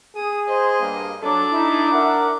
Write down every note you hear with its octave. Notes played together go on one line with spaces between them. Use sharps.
G#4 D#6
C5 D#5
G2 A#3
F#3 D4 A4 D6
D#4 E4
A#4 E5 F#5